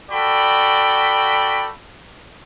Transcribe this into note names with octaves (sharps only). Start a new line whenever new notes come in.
F#4 A4 D5 G5 B5